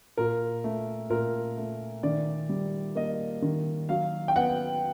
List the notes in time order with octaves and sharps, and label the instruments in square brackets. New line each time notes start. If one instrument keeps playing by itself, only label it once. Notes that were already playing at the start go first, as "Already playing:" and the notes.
[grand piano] A#2 A#4
A3
A#2 A#4
A3
D#3 D5
G3
A#3 D#5
D#3
F#3 F5
G5
B3 F#5